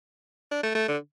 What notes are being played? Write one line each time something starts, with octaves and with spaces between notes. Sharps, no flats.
D4
A3
A3
D3